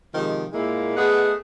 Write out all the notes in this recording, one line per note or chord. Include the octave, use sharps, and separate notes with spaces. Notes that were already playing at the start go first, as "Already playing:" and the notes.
C3 D#3 F3 G#3
A#2 G#3 A#3 E4
A3 B3 G#4 D#5 F#5